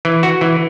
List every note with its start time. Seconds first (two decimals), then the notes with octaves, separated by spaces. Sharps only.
0.05 E3
0.23 F#4
0.41 E3